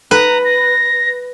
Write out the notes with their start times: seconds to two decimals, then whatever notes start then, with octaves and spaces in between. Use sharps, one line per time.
0.11 B4 A#5
0.44 A#6